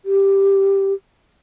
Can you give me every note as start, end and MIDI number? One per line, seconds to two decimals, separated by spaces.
0.05 0.93 67